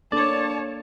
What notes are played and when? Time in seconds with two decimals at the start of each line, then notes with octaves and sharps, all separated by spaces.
0.12 A#3 D4 A4 C#5 D5 A5